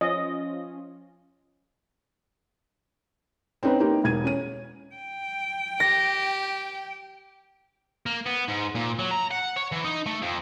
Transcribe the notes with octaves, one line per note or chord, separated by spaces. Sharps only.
F3 C#4 F4 D#5
C4 C#4 D#4 B4
A#3 D#4 G4
E1 G#6 D#7
C#4 D#7
G5
G4 A#6
A#3
B3
G#2
A#2
F#3
A#5
F#5
C#5
E3
D#4
A3
F2